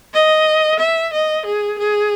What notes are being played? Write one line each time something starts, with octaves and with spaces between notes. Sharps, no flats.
D#5
E5
D#5
G#4
G#4